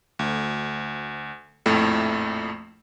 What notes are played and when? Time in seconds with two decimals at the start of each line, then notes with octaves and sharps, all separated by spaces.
0.19 D2
1.66 A#1 F2 A2 A3